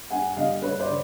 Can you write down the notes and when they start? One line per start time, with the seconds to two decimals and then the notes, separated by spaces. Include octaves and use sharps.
0.10 G2 F#5 G#5
0.36 D3 G3 D#5 F5
0.62 G2 B4 C#5
0.80 C5 D5
0.88 D3